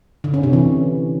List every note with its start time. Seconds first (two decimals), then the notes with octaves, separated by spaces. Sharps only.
0.24 D3
0.34 C#4
0.43 C3
0.53 E3